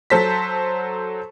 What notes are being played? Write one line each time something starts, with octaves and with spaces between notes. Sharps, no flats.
F#3 A4 C5 A5 B6